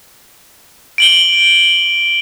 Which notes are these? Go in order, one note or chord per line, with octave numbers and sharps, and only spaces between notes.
D7 F#7 G7